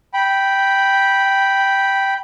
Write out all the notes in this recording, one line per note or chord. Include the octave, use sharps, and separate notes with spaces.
G5 B5